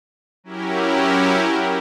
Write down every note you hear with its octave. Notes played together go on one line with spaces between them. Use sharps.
F#3 C#4 E4 G4 A#4